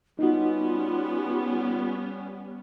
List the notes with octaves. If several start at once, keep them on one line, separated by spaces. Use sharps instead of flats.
G3 B3 C#4 D#4 F4 F#4